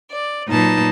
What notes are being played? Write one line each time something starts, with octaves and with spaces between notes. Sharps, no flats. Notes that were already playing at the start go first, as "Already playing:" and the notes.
D5
A#2 F#3 D#4 B4 A5